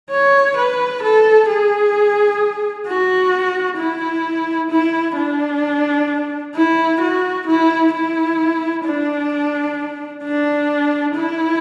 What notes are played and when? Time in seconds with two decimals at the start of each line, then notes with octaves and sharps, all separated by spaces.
0.10 C#5
0.56 B4
1.03 A4
1.49 G#4
2.87 F#4
3.78 E4
4.71 E4
5.16 D4
6.55 E4
7.01 F#4
7.47 E4
7.93 E4
8.85 D4
10.23 D4
11.15 E4